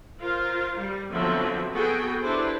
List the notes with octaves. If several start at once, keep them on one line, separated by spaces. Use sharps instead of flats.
F4 A#4 C5 F5
G3
D3 F3 F#3 B3 C4 E5
B3 F#4 G#4 A4 G5
D4 E4 G4 A4 B4 C5